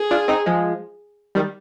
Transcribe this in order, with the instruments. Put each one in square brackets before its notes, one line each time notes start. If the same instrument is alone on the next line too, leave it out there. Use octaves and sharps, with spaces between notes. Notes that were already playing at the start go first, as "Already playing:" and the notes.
Already playing: [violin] G#4
[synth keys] D4 F4
C4 D#4
F3 G#3
D#3 G3